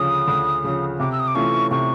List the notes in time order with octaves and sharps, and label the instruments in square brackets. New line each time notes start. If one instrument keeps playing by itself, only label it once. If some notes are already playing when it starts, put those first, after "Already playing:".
Already playing: [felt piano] D2 C#3 F3 [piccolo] D#6
[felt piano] D2
C#3 F3
[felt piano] C3 [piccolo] D6
[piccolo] E6
D#6
D6
[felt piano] E3 A3 C#4 F4 [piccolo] C#6
[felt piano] C3 [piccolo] C#6